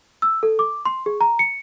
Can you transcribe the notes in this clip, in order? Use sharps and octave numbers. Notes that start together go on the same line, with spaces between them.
E6
A4
D6
C6
G#4
A#5
C#7